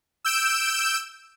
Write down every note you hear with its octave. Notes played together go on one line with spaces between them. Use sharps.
E6 G6 D7 E7